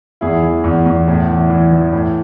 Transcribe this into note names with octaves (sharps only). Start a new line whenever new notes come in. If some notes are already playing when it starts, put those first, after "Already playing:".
E2 E4 G#4
E3
E2
E2
A2
E3
E3
E3
A2